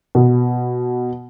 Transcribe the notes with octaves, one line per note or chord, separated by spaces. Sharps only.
B2